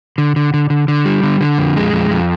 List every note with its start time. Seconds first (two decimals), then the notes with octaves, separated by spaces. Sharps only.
0.18 D3
0.36 D3
0.54 D3
0.70 D3
0.88 D3
1.05 G3
1.23 D3
1.41 D3
1.58 F2
1.76 G#3
1.93 F2
2.11 F2